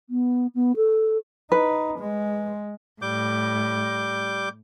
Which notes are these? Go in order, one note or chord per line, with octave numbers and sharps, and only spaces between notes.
B3
B3
A4
D#4 B4
G#3
A2 G3 D6 G6